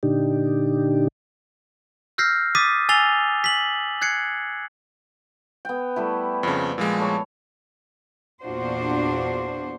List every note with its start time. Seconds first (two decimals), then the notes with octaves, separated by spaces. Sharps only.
0.03 A#2 D3 D4 D#4 G4
2.18 E6 F6 G6 A#6 C7
2.55 D6 D#6 A6 B6 D#7
2.89 G#5 E6 A6 C7 F7 G7
3.44 B6 F#7
4.02 F#6 G#6 C7 C#7
5.65 B3 G5
5.96 G3 A3 E4
6.43 F2 C#3
6.78 A#2 F3 G#3
6.99 A4 C#5
8.43 E2 A#2 D4 F4 F#4 C5